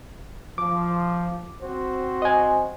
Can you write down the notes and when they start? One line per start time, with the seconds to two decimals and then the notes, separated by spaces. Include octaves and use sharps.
0.58 F3 D6
1.62 C4 F#4 C5
2.22 D#5 G#5